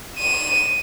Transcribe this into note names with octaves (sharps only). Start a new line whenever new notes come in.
D#7 E7